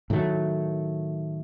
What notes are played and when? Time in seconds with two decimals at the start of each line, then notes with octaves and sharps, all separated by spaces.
0.10 A2 D#3 F#3 A3